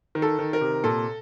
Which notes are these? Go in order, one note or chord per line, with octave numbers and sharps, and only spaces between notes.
D#3
A4
D#3
A#4
C3
A#2 A4